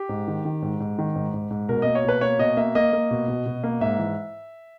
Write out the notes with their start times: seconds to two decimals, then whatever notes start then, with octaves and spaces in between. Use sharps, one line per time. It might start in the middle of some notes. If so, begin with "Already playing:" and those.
Already playing: G4
0.09 G#2
0.28 D#3
0.45 D#3
0.62 G#2
0.80 G#2
0.99 D#3
1.16 G#2
1.34 G#2
1.51 G#2
1.69 B2 A#4
1.82 A#3 D#5
1.95 C#5
2.04 B2 B4
2.21 A#3 C#5
2.39 B2 D#5
2.57 A#3 E5
2.75 A#3 D#5
2.93 A#3
3.11 B2
3.28 B2
3.46 B2
3.64 A#3
3.81 G#2 E5
3.99 E3